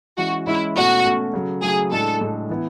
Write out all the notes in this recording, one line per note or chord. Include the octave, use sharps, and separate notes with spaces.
E3 G#3 C#4 F#4
E3 G#3 C#4 E4
B2 A3 C#4 F#4
B2 A3 C#4
C#3 F#3 A3
C#3 F#3 A3 G#4
A2 G#3 D4 A4
A2 G#3 D4
E3 B3 E4